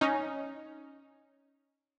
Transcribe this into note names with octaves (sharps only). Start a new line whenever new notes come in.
C#4 D#4